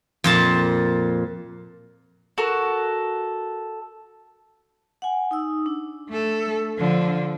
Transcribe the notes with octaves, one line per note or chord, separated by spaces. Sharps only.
F2 A#2 A5
F#4 A4 A#4
F#5 G#5
D#4 D#6 E6
D4
A3 A4
D3 F3